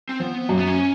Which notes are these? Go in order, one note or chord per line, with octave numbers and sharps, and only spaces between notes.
C4
F3 B3
F#2 F#3 A#3
B3
C#4